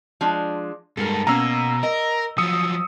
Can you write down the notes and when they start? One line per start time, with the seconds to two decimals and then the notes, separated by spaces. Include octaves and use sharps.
0.21 F3 G#3 D4
0.97 G2 G#3 A4 A#4
1.27 B2 A#3 C#4 A#5 E6
1.83 A#4 D#5
2.38 F3 F#3 D#6 E6 C#7